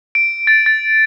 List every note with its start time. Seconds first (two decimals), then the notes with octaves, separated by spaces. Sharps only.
0.15 D7
0.47 A6
0.66 A6